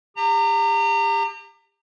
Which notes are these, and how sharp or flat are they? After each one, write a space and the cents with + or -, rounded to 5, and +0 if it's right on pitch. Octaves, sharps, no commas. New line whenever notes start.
G4 +35 A#5 -30